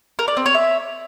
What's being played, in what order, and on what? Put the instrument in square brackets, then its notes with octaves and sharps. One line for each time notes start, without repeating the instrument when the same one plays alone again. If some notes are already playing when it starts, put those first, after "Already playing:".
[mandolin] A#4
D5
C4
C#5
E5